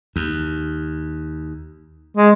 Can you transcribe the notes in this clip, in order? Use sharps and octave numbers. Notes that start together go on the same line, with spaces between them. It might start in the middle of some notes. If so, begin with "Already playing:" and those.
D#2
G#3